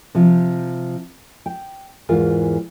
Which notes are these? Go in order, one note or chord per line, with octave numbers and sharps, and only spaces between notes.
C3 F3
G5
E2 G#2 E3 F4 A#4